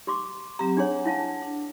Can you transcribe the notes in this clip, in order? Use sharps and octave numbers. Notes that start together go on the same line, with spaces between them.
G4 C6 D6
F#3 C4 G4 A#5
D4 G#4 C#5 F#5 G#5
E4 F5 A5
D4